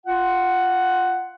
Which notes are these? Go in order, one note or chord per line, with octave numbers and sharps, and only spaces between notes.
F4 F#5